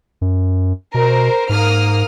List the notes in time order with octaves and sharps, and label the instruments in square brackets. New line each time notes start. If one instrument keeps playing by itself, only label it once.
[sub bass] F#2
[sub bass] B2 [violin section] A#4 C5
[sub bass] G#2 [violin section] A#3 D#6 F6